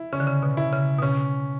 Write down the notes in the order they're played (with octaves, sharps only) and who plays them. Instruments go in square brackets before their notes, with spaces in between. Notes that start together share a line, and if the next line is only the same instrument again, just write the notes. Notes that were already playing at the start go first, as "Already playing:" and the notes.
Already playing: [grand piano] E4
[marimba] C#3 [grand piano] C#4
[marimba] D3
C#3
B2 D3
[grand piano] E4
[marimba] C#3
B2
[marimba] C#3 [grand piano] C#4